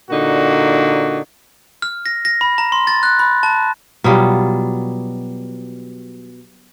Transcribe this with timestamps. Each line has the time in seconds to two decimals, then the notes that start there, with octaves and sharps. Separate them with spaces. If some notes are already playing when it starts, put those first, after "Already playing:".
0.11 A#2 D3 D#4 F#4
1.82 F6
2.06 A#6
2.25 A#6
2.41 B5
2.58 A#5
2.72 C6
2.87 A6
3.03 F#6
3.19 B5
3.43 A5
4.04 B2 F#3 G3 F4